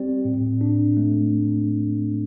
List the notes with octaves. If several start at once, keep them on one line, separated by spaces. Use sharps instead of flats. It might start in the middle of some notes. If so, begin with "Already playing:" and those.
Already playing: G3 C4 G4 D5
A2
D4
A3